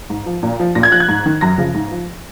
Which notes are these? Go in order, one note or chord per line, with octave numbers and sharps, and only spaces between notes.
G#2
F3
A#2
F3
A#2 A#6
G#6
F3 F#6
G#6
G#2
D#3
F#2 A#6
C#3 F3
G#2
F3